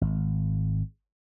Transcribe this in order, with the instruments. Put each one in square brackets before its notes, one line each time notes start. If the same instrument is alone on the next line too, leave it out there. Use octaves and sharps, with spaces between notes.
[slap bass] G#1